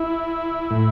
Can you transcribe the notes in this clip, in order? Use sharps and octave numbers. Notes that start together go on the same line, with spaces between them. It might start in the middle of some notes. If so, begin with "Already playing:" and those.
Already playing: E4
A2